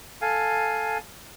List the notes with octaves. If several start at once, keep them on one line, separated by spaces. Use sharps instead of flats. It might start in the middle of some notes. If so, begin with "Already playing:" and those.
A4 F5 G#5